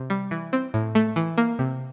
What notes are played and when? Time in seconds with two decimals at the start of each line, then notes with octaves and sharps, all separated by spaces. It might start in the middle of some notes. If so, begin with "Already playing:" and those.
Already playing: C3
0.10 G3
0.31 E3
0.53 C4
0.74 A2
0.95 A3
1.16 E3
1.38 A#3
1.59 C3